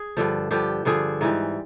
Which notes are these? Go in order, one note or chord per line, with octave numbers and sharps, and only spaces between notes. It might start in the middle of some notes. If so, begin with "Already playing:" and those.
Already playing: G#4
G2 D3 F3
G2 D3 F3 G4
G2 D3 F3 G#4
G#2 E3 G3